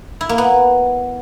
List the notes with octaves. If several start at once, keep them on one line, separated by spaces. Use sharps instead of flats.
E4
A#3
B3